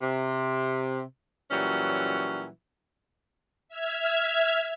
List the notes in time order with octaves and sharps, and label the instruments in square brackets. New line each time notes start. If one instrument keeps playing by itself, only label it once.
[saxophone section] C3
A#2 E3 F#3 G3 C#4
[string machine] E5 F6 G#6